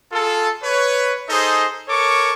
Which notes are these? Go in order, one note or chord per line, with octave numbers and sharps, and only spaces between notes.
F4 G#4 A4
B4 C#5
D#4 G#4 A4 C5 D#5
A4 A#4 C#5 C#6 D6